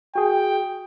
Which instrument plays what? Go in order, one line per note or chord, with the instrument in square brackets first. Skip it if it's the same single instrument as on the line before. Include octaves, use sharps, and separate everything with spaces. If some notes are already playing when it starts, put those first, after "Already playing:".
[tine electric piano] F#4 G#4 [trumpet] G5